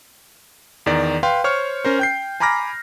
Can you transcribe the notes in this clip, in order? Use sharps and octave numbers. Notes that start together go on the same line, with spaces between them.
E2 D#3 D5
B4 F5 G5 C6
C5 C#5 C#6 F6
C#4 A#4 C5
G5 G6 C7
G#5 A#5 B5 D6 F6 A#6